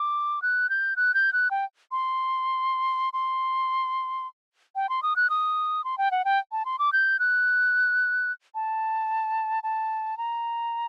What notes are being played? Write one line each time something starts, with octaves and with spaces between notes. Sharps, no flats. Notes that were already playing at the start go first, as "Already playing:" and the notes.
Already playing: D6
F#6
G6
F#6
G6
F#6
G5
C6
C6
G5
C6
D#6
F#6
D#6
C6
G5
F#5
G5
A5
C6
D6
G6
F#6
A5
A5
A#5